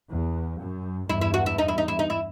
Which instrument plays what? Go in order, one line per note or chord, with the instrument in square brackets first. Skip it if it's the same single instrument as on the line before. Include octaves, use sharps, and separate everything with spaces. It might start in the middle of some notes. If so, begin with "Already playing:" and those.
[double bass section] E2
F#2
[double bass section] E2 G2 [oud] E4
[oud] E4
F#4
E4
D#4
E4
D#4
E4
D#4
E4